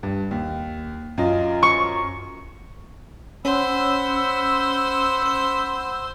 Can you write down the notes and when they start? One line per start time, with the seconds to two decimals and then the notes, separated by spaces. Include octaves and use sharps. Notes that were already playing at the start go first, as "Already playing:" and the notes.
0.03 G2
0.31 D#2
1.18 F#2 F4 D#5
1.63 C#6
3.45 C#4 C5 F#5 B5 E6